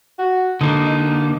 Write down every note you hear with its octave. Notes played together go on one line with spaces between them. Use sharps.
F#4
D3 A#3 D#4
D#4